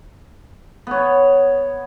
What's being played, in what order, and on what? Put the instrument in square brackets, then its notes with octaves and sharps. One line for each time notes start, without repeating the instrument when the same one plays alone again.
[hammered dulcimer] B3 C#5